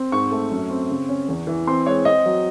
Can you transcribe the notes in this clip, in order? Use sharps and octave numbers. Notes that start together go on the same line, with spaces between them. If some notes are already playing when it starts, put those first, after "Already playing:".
Already playing: C4
G#2 C#6
A3
F#2
C4
C#3
C#4
E2
E3
C4 C6
G#3 C#5
C4 D#5
F#3